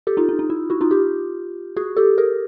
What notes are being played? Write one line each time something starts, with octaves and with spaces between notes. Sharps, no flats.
G4 A4
D#4 F4
D#4
D#4
E4
E4 F#4
D#4 F4
F4 G4
F#4 G#4
G4 A4
G#4 A#4